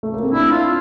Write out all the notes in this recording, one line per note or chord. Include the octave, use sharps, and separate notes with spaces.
A3
A#3
C4
D4 E4
F4